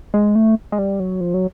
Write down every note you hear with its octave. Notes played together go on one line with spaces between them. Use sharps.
G#3
A3
G#3
G3
F#3
F3
F#3